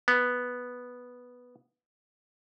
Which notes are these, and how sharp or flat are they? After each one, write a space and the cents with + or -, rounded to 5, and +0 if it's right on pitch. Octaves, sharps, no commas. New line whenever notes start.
B3 -5